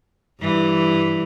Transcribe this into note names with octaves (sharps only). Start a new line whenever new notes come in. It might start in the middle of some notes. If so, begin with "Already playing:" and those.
G2 E3